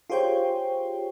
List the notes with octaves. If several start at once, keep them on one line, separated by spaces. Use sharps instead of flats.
F4 G4 G#4 C5 C#5 G5